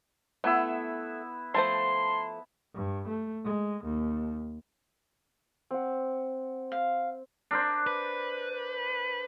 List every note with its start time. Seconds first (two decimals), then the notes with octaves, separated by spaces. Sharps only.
0.44 A3 B3 E4 E6
1.54 F3 A3 C5 A5 C6
2.75 G2
3.08 A3
3.44 G#3
3.84 D#2
5.71 C4 F#5
6.72 F5
7.51 D4 A#4 C5
7.87 B4